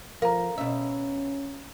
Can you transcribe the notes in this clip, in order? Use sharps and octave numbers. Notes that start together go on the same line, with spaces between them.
F3 A#4 F5 A#5
B2 C#4 E5